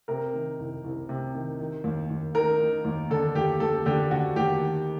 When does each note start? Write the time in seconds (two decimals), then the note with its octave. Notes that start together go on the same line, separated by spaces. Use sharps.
0.08 C3 A#4
0.33 D#3
0.59 C2
0.84 C2
1.09 C3
1.35 D#3
1.60 D#3
1.84 D#2
2.10 D#2
2.35 D#3 A#4
2.60 D#3
2.85 D#2
3.10 D3 A4
3.35 D#2 G4
3.60 D#2 A4
3.86 D3 G4
4.11 D3 F#4
4.36 D#2 G4
4.61 D#3